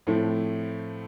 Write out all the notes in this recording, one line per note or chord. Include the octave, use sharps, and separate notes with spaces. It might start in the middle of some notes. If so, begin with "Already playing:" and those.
A2 F3 A3 C4 E4